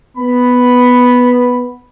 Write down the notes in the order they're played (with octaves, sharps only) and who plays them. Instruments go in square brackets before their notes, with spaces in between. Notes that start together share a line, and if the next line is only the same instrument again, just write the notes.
[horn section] B3 B5